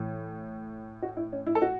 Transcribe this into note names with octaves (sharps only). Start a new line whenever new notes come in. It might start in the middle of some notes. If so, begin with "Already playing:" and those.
Already playing: A2 E3
F#4
E4
C#4
E4
A4
F#4